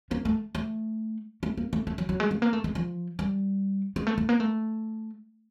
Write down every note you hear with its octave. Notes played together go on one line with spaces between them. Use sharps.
A#3
A3
A3
A3
A#3
A3
A3
F#3
F#3
G#3
A3
A#3
A3
G#3
F3
G3
G#3
A3
A3
A#3
A3